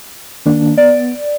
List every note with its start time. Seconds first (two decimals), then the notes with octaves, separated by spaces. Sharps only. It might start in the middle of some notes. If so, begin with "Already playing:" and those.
0.46 D#3 A#3 D4
0.78 B3 D5